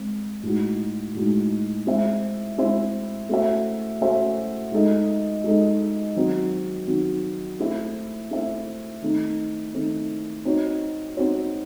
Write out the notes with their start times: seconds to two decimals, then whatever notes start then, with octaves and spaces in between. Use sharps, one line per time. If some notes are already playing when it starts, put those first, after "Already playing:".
Already playing: G#3 C4
0.43 A2 G#3 D#4 F#4
1.15 A2 G#3 D#4 F#4
1.87 G#3 C4 E4 C5 E5
2.58 G#3 C4 E4 C5 E5
3.29 A3 C#4 F#4 C5 E5
4.01 A3 C#4 F#4 C5 E5
4.72 G#3 D#4 A4 D#5
5.44 G#3 D#4 A4 D#5
6.16 D#3 F#3 C4 F#4
6.87 D#3 F#3 C4 F#4
7.59 A3 C4 E4 C5 E5
8.31 A3 C4 E4 C5 E5
9.02 D#3 A3 C4 D#4
9.74 D#3 A3 C4 D#4
10.45 C4 D#4 F#4 C#5
11.17 C4 D#4 F#4 C#5